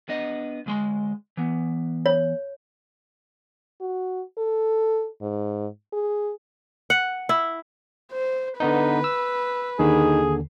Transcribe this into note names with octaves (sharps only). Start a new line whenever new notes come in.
B3 D4 D#5
D2 G#3 C6
E3 B3
C#5
F#4
A4
G#2
G#4
F#5
E4
C5
D3 B3 D#4 B4
E6
D#2 D3 D#3 G#4